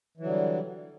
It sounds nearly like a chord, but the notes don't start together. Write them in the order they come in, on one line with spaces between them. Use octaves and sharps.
E3 F#3 D3 G3